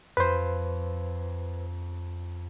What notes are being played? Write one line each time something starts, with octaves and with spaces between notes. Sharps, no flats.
F2 B4 C5